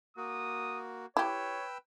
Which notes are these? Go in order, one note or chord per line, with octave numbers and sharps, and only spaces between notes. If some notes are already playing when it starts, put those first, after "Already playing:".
A#3 F#4 D#6
E4 G4 B4 C#5 G5 E6